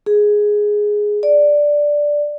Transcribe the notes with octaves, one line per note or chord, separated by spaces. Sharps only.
G#4
D5